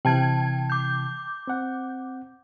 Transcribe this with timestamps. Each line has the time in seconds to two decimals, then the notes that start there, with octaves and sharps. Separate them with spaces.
0.05 C3 E3 G5 A5 G#6
0.70 D6 G6
1.47 C4 F#5